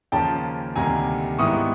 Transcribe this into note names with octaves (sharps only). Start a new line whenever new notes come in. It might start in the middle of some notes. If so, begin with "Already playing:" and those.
D#2 C#3 F3 A#3 C#4 G5 A5
D2 C3 D#3 G3 A#3 G#5 A#5
G#2 D#3 G3 B3 E4 C#6 D#6